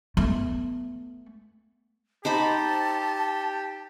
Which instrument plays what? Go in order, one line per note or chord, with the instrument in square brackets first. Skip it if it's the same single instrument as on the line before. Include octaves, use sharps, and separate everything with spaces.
[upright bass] A3 B3
[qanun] D#4 C5 B5 [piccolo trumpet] G4 [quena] A5